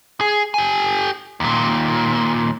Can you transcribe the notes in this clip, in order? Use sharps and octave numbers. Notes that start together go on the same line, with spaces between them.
G#4
G4 G#5
D#2 A#2